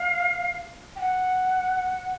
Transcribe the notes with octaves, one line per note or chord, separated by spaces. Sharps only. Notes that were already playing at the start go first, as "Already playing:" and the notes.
Already playing: F5
G5
F#5